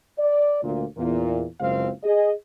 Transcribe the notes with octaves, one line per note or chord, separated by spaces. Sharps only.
D5
D2 A#2
E2 A#2
F#1 C#2 C4 F5
G#4 D#5